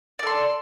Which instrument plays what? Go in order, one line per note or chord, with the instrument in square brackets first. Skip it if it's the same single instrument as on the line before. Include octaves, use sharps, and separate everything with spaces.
[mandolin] D5
A4
C6